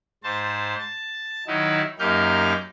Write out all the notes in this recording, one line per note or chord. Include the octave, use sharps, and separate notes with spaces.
G#2 C5 A5
A5
D#3 F#3 D#4 E4
F#2 A#3 D#4 G4 F6 G6